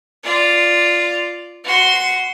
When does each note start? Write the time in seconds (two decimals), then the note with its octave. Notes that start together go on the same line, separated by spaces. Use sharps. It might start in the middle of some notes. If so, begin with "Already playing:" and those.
0.23 F4 D5
1.64 F#4 C6